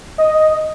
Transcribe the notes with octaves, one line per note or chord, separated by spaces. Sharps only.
D#5